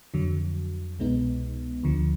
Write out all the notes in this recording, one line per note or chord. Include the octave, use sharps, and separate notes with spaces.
F2 D3 F#3
C2 B2 G#3 B3 D#4
D2 D3 F3